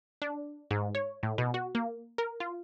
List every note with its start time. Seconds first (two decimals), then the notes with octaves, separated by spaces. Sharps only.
0.22 D4
0.71 G#2
0.95 C#5
1.23 A2
1.38 B2
1.54 F#4
1.75 A#3
2.18 A#4
2.40 F4